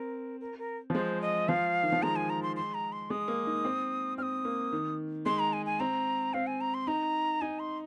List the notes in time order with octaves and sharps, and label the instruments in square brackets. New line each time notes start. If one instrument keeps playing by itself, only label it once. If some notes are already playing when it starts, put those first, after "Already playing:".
Already playing: [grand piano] C4 [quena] A#4
[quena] A#4
A#4
[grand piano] F3
[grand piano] G#3 [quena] C5
[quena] D#5
[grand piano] F3 [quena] F5
[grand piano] D#3
F3
[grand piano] G#3 [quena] A#5
[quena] G#5
A#5
C6
C6
A#5
C6
[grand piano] G#3 [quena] D#6
[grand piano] A#3
D#4
C4
[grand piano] C4 [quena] D#6 F6
[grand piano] A#3
D#3
[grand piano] G#3 [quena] C6
[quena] A#5
G#5
G#5
[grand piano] C4 [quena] A#5
[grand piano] C4 [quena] F5
[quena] G#5
A#5
C6
[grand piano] D#4 [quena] A#5
[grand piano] D#4 [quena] G#5
[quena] C6